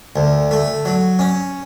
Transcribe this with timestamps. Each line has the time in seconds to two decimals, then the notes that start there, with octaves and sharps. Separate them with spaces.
0.16 D2
0.51 A3
0.85 F#3
1.19 C#4